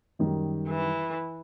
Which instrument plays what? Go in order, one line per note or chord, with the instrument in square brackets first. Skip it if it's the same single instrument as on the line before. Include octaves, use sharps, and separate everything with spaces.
[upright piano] F#2 D#3 G3
[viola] E3